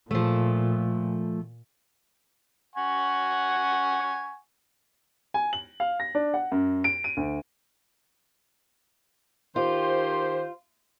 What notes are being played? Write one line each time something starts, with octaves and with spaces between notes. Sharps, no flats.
A#2 F3 A3
F#5 G#5 C#6
G#5
F#7
F5
A#6
D4
F#5
F#2
D7
D#7
D2
D#3 F4 G4 C5